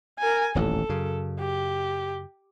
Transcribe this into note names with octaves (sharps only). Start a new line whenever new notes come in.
A#4 G#5
D#1 A1 F2 A4
F#2 C#3
G4